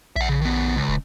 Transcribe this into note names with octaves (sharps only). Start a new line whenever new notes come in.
A#1 E5 F#5
C#3
D#3 B3
C#2
D#1